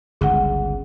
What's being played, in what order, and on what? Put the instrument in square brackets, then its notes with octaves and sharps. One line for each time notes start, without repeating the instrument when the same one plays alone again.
[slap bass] G1 C#2 [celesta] G#4 F#5